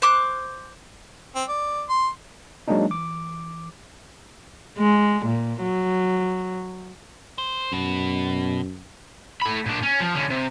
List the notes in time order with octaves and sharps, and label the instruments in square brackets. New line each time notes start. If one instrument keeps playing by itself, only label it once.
[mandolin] C5 D6 F#6
[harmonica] C4
D5
C6
[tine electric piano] F#3 G#3 A#3 D4 D#4
E3 D6
[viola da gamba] G#3
A#2
F#3
[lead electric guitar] C5
[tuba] F#2 [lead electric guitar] B2
[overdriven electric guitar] A3 B5
A#2 D4
C#4
F3
D3 C#4
C3